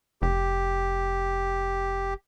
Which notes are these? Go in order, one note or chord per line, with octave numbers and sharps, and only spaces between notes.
F1 G4